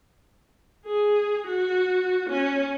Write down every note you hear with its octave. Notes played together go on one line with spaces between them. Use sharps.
G#4
F#4
C#4